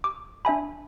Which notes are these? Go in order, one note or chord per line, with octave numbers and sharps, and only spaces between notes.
D6
D4 E5 G#5 B5